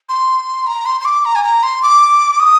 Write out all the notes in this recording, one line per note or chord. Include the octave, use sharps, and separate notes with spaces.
C6
A#5
C6
C6
D6
A#5
G#5
A#5
C6
D6
D#6